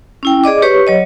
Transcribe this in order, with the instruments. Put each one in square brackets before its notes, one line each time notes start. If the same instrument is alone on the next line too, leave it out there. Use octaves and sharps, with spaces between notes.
[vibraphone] C#4 E4 G5
G#4 D5 D#5 D6
G4 B4 C#5 C#6
F#3 C#5 D#5